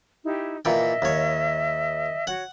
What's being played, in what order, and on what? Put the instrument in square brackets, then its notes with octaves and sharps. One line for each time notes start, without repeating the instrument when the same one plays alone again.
[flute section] D#4 E4 G4
[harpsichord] A#2 E3 G5 [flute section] D#5 E5
[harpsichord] D#2 C#5
[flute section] F#4 C#5 [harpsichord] F#5